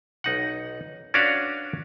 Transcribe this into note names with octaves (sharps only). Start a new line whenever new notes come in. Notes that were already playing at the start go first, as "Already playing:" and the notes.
B1 D#4 F#5
C#4 D4 F#4 B4 D5 F5